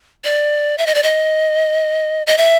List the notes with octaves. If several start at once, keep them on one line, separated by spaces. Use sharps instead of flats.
D5
E5
D#5
D5
D#5
D#5
E5